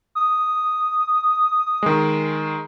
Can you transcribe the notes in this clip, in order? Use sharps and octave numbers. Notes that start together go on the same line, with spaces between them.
D#6
D#3 G#3